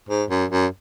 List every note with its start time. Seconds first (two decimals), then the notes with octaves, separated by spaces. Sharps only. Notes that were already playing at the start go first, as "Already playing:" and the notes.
0.09 G#2
0.30 F#2
0.51 F#2